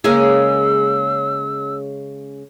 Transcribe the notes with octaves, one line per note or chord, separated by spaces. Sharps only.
C#3 G#3 A#3 C#4 G#4 E6